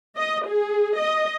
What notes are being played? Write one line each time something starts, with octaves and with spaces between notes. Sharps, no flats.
D#5
G#4
D#5